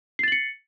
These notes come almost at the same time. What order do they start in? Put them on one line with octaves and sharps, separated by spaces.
C7 A6 F#7 C#7